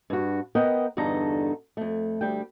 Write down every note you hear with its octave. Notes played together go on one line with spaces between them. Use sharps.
G2 F#4
B3 A#4 D#5 F#5 G5
E2 G2 D3 D#4 A4 A#5
F2 A3
D2 G3 G5